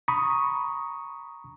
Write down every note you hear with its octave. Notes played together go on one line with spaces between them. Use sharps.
A#5 B5 C#6 D#6